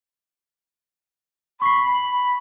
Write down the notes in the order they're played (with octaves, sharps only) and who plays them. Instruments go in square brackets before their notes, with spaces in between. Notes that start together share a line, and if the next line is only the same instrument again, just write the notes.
[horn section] B5 [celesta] C#6 B6 C7